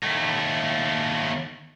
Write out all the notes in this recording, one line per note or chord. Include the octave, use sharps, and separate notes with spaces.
D#2 A3